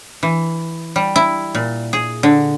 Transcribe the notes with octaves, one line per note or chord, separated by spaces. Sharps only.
E3
G3
E4
A#2
G#4
D3